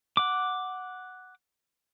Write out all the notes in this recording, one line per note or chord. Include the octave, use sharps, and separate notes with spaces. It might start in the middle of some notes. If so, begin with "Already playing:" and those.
F#5 D6